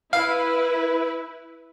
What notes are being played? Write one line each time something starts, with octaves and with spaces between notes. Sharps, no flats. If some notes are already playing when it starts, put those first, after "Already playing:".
E4 B4 F5